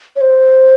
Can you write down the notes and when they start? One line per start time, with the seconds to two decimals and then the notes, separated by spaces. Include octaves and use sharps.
0.16 C#5
0.21 C5